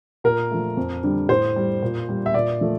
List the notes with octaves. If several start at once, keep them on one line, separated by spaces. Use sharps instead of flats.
A#2 A#4
F3 A3
F2
D3 G3
A2 C5
G3
A#2
G3
E5
A#2 D5
F3 A3